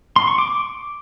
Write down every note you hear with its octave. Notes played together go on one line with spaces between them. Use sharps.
C6
C#6
D6